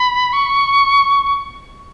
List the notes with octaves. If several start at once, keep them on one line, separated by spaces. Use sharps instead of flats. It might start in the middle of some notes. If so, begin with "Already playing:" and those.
Already playing: B5
C#6